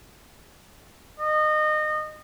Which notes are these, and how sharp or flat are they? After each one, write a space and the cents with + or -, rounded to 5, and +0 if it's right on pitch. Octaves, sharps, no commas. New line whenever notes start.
D#5 -25